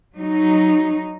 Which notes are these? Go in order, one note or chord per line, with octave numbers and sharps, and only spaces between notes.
F#3 D#4